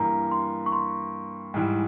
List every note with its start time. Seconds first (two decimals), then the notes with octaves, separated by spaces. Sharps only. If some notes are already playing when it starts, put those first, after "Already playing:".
Already playing: G2 E3 A#3 A#5
0.31 C6
0.66 C#6
0.72 C6
1.54 G#2 E3 G3